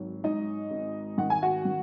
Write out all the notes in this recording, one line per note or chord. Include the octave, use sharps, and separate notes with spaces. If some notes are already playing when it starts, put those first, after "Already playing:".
Already playing: G#1 F#3
G#2 D#4 D#5
G#1
D#3 F#5
G#5
F#4 F#5
D#3